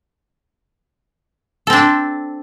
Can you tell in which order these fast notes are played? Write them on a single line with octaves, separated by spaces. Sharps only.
A4 C4 D4